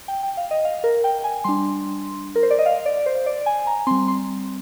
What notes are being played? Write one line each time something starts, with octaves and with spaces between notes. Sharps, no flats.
G5
G5
F5
D#5
F5
A#4
G5
G#5
G3 D4 C6
A#4
C5
D5
D#5
F5
D5
C5
D5
G#5
A#5
G3 C4 C6
C6